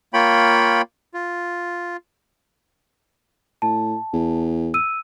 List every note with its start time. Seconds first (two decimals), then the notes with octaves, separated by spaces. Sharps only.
0.13 A#3 F4 C#5 G5 B5
1.14 F4
3.62 A2 A5
4.13 E2
4.74 E6 D#7